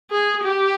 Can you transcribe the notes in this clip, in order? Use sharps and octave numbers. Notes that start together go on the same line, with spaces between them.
G#4
G4